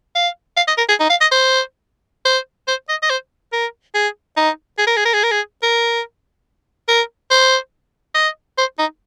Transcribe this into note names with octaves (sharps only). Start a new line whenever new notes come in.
F5
F5
D#5
A#4
G#4
D#4
F5
D#5
C5
C5
C5
D#5
D#5
C5
A#4
G#4
D#4
G#4
A#4
G#4
A#4
G#4
A#4
G#4
A#4
A#4
C5
D#5
C5
D#4